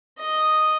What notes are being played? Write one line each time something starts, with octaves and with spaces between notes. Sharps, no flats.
D#5